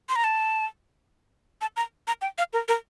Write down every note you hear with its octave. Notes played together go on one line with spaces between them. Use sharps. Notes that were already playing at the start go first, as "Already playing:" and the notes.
C6
A#5
A5
A5
A#5
A#5
G5
F5
A#4
A#4